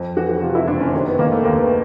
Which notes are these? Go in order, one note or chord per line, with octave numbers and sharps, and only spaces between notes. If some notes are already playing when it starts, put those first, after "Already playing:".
Already playing: F2
E3 F#4
F#4
C3 F4
E4
F#1 D4
C#4
D#3 C4
B3
D#3 A#3
A3
D#2 A#3
B3